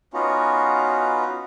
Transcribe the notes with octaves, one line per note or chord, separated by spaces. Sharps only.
B3 C#4 D#4 F4 F#4